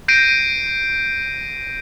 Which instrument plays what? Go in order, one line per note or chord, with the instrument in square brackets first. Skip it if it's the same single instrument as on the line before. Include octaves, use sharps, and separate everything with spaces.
[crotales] G6 A#6 C7 D7 D#7